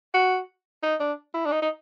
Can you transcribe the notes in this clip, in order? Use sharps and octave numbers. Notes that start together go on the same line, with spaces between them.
F#4
D#4
D4
E4
D4
D#4
D#4